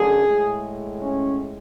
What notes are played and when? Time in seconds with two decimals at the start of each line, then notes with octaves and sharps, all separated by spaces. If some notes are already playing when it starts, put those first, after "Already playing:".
Already playing: F#2 D3 F#3 A3 G#4
0.26 A2 G#3
1.02 C#4